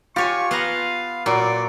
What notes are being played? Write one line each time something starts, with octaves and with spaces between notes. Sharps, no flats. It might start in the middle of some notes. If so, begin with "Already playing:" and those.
F4 G4 C#5 G#5 C#6
B3 F5 F#5 A#5
A#2 F#3 D5